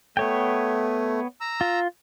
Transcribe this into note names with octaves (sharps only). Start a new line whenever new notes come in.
A3 B3 C#5 G5
A#5 E6
F4